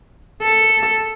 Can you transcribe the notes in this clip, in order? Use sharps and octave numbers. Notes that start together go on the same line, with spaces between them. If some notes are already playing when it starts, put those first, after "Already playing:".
A4